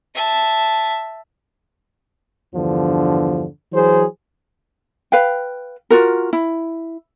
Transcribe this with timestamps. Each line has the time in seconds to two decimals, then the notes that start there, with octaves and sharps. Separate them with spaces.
0.15 E5 A5
2.54 E2 G2 D3 F3
3.72 E3 F#3 G#4 C5
5.12 B4 F5 G5
5.90 F4 F#4 A#4
6.33 E4